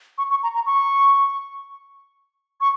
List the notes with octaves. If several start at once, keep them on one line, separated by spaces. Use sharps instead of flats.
C#6
C#6
A#5
A#5
C#6
C#6